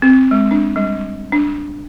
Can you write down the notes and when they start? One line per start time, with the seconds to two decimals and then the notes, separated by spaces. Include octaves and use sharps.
0.02 C4
0.31 G#3
0.51 D4
0.76 G3
1.32 D4